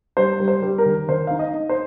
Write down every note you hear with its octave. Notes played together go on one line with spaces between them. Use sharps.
G3 C5
G3
C5
G3
A#4
D#3
D#3 C5
D#4 F5
D#5
D#4
C5